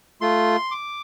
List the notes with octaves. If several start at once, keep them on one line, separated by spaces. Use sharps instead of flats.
A3 F4 C6
D6